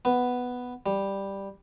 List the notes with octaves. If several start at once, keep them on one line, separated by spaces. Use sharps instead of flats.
B3
G3